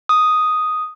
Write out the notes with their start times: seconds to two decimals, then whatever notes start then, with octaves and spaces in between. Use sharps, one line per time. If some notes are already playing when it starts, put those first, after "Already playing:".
0.09 D#6